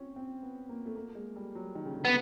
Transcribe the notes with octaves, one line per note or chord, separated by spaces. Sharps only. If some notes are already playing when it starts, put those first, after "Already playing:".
Already playing: C4 C#4
C4
B3
A#3
A3
A#3
G#3
G3
F#3
D#3
C#3
D3
B3